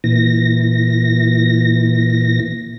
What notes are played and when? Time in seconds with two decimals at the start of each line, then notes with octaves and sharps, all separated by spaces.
0.04 A#2 E3 A#6